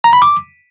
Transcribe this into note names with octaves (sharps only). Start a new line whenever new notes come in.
A#5
B5
D6